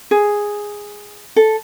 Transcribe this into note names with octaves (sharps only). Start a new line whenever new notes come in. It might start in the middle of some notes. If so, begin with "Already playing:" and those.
G#4
A4